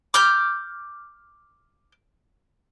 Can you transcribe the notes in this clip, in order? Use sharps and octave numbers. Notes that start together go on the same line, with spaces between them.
D6 F6 G6